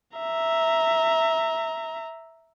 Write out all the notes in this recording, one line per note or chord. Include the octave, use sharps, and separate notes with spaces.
E5 A#5